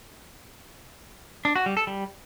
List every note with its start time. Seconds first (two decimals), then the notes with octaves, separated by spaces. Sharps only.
1.45 D4
1.56 F#4
1.66 G3
1.77 A4
1.87 G3